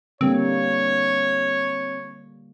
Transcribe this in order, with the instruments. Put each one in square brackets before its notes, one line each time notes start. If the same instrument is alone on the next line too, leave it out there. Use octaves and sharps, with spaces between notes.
[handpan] D3 G3 A#3 [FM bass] C4 [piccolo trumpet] C#5